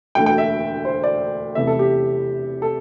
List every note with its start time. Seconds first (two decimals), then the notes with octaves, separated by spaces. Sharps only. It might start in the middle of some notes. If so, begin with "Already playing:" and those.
0.15 E1 D2 D3 A3 G5
0.26 G5
0.38 E5
0.85 C5
1.04 D5
1.55 E2 C3 E3 A3 E5
1.67 A4
1.79 G4
2.62 A4